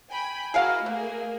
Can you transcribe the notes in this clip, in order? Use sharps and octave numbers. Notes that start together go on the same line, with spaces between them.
G5 G#5 B5
E4 F#4 G#4 A#4 D#5 F5
B2 A3 A#3 G#4